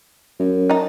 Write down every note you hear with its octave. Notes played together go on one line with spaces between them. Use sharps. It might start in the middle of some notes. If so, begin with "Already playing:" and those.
F#2
D#4 A5